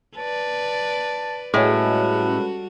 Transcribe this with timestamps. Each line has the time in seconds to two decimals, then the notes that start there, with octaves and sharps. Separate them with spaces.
0.17 B4 D5 A5
1.54 A2 G3 G#3 C#4 F#4 B4